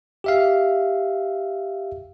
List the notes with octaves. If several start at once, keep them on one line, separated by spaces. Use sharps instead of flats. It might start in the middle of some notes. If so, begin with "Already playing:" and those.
G4 E5 F5